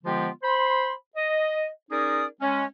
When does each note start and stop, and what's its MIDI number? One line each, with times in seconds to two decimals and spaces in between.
0.04 0.29 50
0.04 0.29 53
0.04 0.29 56
0.04 0.29 59
0.04 0.29 65
0.04 0.29 67
0.43 0.92 72
0.43 0.92 83
0.43 0.92 84
1.16 1.67 75
1.91 2.25 61
1.91 2.25 63
1.91 2.25 68
1.91 2.25 70
1.91 2.25 74
1.91 2.25 87
2.40 2.64 56
2.40 2.64 61